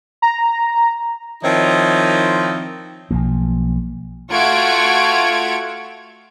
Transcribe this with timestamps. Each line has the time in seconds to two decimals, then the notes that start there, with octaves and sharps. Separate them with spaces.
0.22 A#5
1.43 D#3 F3 C4 D#4 E4 C#5
3.11 B1 F3 A#3
4.31 A3 F4 F#4 C#6 G#6 D7